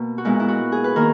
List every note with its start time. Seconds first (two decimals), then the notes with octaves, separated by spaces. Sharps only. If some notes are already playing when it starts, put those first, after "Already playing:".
Already playing: B2 A#3
0.18 F#4
0.25 A#2 G#3 B3 E4
0.40 E4
0.48 F#4
0.72 G#4
0.84 B4
0.96 D#3 A#3 A#4